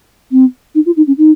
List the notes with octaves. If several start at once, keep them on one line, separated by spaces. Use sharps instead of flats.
C4
D#4
F4
D#4
C#4
D#4